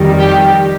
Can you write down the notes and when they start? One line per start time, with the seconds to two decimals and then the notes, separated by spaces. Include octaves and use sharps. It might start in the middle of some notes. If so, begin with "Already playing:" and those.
Already playing: F2 D#3 G3
0.19 G4